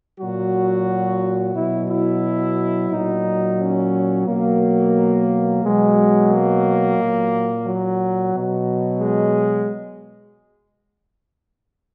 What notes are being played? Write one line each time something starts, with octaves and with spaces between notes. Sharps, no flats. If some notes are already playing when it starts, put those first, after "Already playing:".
A#2 F#3 F#4
B2 F#3 E4
E4
A#2 F#3 D#4
C#4
B2 F#3 A#3
B2 F#3 G#3
A#3
A#2 F#3
F#3
B2 F#3
G#3